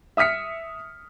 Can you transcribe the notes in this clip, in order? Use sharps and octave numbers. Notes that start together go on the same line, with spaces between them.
E5 D#6 F6 B6 C#7